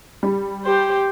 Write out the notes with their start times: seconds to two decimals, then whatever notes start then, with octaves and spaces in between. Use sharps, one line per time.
0.23 G3
0.65 G4 C5